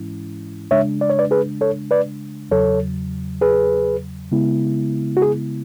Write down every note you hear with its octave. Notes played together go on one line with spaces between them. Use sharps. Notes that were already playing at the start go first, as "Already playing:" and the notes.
Already playing: G#2 E3 G#3 C#4 E4
C#3 G#3 D4 C#5 E5
D5
C#5
B4 D5
G#4 B4
A4 C#5
B4 D5
E2 C#3 F#3 A4 C#5
G#4 B4
C#3 G#3 B3 E4
F#4
G#4